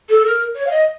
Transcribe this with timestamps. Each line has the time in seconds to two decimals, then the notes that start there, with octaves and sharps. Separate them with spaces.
0.09 A4
0.26 A#4
0.56 C#5
0.67 F5
0.71 D#5